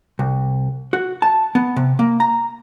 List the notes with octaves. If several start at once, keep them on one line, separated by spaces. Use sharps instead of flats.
C2
F#4
A5
B3
C3
A#3
A#5